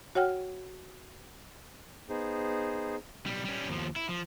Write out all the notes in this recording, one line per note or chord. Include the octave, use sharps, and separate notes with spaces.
F#4 C#5 F#5 G5 F6
B3 D#4 G#4 C5
B1 G3
G3 C#4
D#2 F3
E4
F3